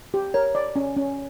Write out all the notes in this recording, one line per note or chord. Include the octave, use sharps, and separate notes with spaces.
G4
A#4 C#5
D5
C#4
C#4